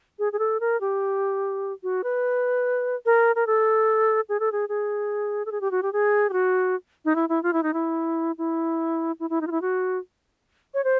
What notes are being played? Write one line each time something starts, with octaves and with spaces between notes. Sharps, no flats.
G#4
G#4
A4
A#4
G4
F#4
B4
A#4
A#4
A4
G#4
A4
G#4
G#4
A4
G#4
G4
F#4
G4
G#4
G4
F#4
D#4
E4
E4
F4
E4
D#4
E4
E4
E4
E4
D#4
F4
E4
F#4
C#5
C5